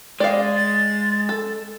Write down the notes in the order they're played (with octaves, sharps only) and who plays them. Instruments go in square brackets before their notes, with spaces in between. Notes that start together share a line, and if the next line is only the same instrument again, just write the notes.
[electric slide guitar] G#3 [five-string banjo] D5 F5
[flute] A6
[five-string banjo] A4